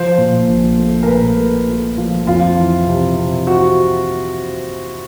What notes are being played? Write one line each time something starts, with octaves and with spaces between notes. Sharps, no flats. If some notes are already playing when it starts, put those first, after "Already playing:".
Already playing: F3 C5
A#2
A#1
A3
A#4
A#2 B4
A3
A3
F3
F2 F4
E3
C3
C3
F#4